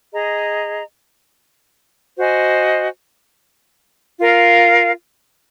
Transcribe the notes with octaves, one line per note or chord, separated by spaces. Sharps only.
G#4 D#5 A#5
F#4 C5 D#5 G#5
F4 A#4 F5